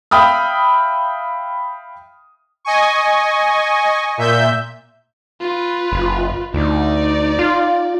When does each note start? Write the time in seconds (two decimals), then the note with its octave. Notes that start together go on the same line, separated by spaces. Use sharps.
0.11 E5 F5 G5 B5 D#6 F6
2.65 D#5 G#5 C#6
4.18 A#2 E5 G6
5.41 F4 B4
5.92 F#1
6.54 D2 D#4 D5
7.39 F4